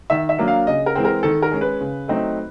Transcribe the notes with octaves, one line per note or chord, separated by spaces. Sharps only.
D#3 E5
E5
F#3 A#3 D4
F5
C#3 D#5
A#4
E3 G#3 C4
A#4
D#3 A4
A#4
G#3 C#4
B4
C#3
F#3 A3 C4 D#4